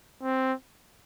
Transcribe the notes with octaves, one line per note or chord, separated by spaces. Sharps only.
C4